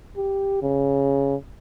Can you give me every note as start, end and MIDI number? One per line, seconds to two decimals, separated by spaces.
0.16 0.58 67
0.62 1.35 49